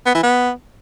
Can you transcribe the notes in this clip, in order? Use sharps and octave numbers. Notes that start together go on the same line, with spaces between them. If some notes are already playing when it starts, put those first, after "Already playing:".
B3
E3
B3